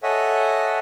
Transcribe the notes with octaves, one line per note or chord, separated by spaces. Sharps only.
A4 C#5 D#5 E5 F#5 G#5